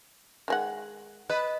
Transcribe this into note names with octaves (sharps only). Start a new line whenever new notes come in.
D#3 G#3 F#5
B4 D#5